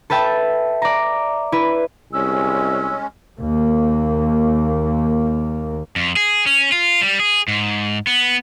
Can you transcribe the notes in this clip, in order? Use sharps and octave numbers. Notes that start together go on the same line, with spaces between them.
A4 B4 E5 G5 A5
D5 A#5
E4 B4
C2 G#3 C#4 E6
D#2 A#3
F2
G#4
C#4
F4
G3
G#4
G#2
B3